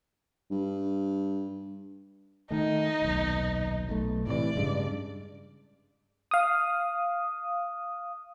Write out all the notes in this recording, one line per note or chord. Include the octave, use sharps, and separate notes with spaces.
G2
D#3 A3 D#4
D#1 B1
B1 A3
A2 C3 E3 D5
G2 C#3 G#3
F5 D#6